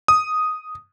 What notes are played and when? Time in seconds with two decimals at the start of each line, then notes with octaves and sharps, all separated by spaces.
0.08 D#6